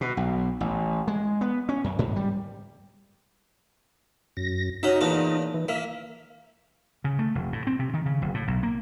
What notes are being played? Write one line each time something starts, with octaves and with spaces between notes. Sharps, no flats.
B2
B1
A1
G#3
B3
C#4
F#2
G#2
G3
F#2 A#6
C#4 D#4 F#4 E5
E2 A#2 D4
E3
A#3 E5
C#3
A3
F1
A2
C4
C3
D#3
C#3
F#1
A2
B1
A#3